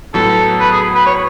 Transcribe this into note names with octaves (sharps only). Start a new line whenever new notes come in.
A2 F#3 B3 A4
B4
G#4
B4
C#5